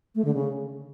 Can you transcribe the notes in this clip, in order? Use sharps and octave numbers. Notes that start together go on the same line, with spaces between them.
A3
D3
C#3